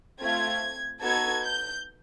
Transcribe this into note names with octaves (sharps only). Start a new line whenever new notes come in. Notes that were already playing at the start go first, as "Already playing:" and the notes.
A3 C4 F4 G#6
B3 D#4 F#4 A4 G#6
G6